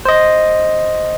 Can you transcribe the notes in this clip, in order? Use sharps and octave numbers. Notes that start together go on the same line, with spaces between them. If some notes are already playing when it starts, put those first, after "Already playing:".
C5 D#5